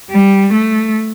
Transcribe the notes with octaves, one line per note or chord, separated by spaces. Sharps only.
G3
A3